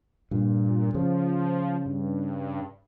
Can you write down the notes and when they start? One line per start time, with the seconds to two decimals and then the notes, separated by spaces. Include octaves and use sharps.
0.31 G2 A#2
0.94 C#3 F3
1.86 G2